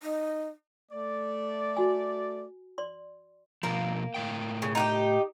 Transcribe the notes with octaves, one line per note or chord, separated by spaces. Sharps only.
D#4
A3 D5
F#4 G#5
D5 C6
B2 F3 A#3
A2 A#4 G5
C#3
D#4 F#4 G4